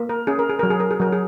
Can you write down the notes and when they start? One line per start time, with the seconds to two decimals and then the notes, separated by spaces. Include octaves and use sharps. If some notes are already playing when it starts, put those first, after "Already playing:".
Already playing: A#3
0.09 A#4
0.27 C#4 G#4
0.39 A#4
0.49 G#4
0.59 F#3 A#4
0.70 G#4
0.80 A#4
0.91 G#4
1.00 F#3 A#4
1.12 G#4